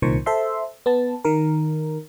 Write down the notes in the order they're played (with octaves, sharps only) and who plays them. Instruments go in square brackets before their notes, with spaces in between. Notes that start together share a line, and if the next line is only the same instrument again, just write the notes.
[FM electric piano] C2 A#2 D#3 C5 C#6
A4 C5 E5 C6
B3 A5
D#3 A#4